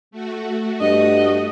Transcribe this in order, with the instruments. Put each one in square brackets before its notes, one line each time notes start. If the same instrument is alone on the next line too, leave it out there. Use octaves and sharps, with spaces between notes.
[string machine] A3 F#4
[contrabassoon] G2 [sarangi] D#5